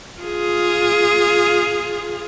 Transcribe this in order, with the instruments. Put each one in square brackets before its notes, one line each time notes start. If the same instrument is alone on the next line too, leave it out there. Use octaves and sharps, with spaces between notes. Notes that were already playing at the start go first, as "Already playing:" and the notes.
[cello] F4 G#4